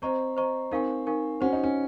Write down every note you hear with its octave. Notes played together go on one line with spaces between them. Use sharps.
C4 C5 D#5 A#5 C#6
C5 D#5 A#5 C#6
C4 D#4 A#4 F5 G#5 C#6
D#4 A#4 F5 G#5 C#6
C#4 F#4 C5 F#5
D#4
C#4